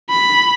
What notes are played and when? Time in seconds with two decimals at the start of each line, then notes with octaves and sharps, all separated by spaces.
0.10 B5